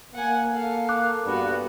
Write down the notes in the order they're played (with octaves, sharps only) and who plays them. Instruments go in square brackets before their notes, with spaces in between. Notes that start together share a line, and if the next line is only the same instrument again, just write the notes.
[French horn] A#3 [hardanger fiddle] F#5 G#5
[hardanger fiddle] A4 F5
[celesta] D6 F#6
[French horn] G2 [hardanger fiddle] B3 F#4